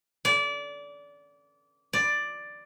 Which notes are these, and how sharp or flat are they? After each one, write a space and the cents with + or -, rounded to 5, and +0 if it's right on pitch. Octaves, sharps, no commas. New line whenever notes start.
D5 -25
D5 +5